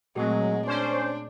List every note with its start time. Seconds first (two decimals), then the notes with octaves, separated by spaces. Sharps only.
0.16 A#2 F#3 G#3 A3 C4
0.66 C#4 D4 C5